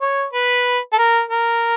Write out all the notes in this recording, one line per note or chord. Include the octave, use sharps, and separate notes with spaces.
C#5
B4
A4
A#4
A#4